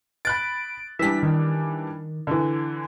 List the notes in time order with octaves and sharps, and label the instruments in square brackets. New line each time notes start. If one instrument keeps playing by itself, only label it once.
[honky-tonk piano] B5 F#6 A6 [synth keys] D7
[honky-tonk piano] E3 G3 D4 [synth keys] E5 B6
[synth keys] D#3
[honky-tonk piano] D3 E3